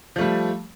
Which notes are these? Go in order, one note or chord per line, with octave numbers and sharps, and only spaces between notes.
F3 G3 A3